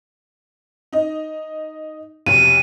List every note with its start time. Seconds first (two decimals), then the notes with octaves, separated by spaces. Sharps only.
0.93 D#4 D#5
2.26 B1 F2 C3 D#7